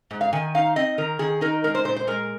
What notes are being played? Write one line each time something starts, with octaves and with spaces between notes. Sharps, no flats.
G#2
F5
D#3 G#5
D#4 F5
C4 D#5
D#3 A#4
D#3 G#4
D#4 A#4
G#3 A#4
C5
A#2 C5
C5
G#3 A#4